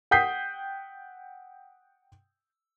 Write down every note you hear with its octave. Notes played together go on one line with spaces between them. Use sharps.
F#5 G5 D#6 G6 B6 C7